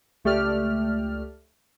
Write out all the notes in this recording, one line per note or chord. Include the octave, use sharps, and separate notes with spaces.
C#2 A3 G4 D5 F6